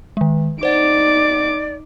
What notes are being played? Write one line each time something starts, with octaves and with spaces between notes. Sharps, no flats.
D#3 G#3
D#4 C5 D5 F#5 D6